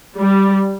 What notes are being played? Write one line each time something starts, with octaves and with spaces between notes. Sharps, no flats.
G3